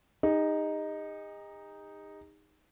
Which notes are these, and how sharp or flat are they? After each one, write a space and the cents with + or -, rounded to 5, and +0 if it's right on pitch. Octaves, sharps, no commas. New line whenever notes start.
D#4 +0 G#4 -45